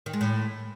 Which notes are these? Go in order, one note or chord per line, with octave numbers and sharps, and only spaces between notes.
D#3
G#3
A2